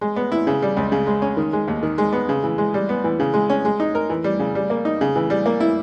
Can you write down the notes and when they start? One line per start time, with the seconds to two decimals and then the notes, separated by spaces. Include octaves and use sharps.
0.01 G#3
0.16 B3
0.32 E4
0.47 C#3
0.62 G3
0.77 C#2
0.92 C#3
1.07 G#3
1.22 C#4
1.37 D#3
1.53 G#3
1.68 D#2
1.83 D#3
1.98 G#3
2.13 B3
2.29 C#3
2.44 E3
2.58 G#3
2.74 G3
2.89 B3
3.04 E3
3.20 C#3
3.34 G#3
3.50 C#4
3.65 G#3
3.80 D#4
3.95 A#4
4.10 E3
4.24 G3
4.39 C#3
4.55 G3
4.70 A#3
4.85 D#4
5.01 C#3
5.16 E3
5.30 G3
5.46 A#3
5.60 E4